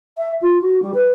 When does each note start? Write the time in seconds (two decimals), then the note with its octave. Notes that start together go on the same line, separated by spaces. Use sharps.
0.17 E5
0.41 F4
0.61 F#4
0.82 G3
0.94 B4